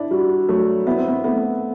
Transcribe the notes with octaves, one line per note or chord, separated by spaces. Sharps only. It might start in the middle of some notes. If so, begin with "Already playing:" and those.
Already playing: D4 E4
G3 F#4
F#3 A3
B3 E4
C4
B3
A3 B3